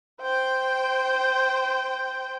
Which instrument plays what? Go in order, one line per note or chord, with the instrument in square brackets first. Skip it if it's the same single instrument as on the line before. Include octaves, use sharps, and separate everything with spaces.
[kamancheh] C5 G5